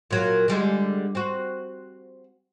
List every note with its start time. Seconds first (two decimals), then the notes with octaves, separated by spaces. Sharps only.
0.11 A#2 F#3 A#3
0.48 D3 G3 G#3
1.15 C4 F#4